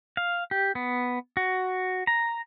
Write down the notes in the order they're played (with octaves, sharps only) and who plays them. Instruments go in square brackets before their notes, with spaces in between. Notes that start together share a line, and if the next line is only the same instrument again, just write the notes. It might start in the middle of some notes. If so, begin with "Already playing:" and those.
[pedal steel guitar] F5
G4
B3
F#4
A#5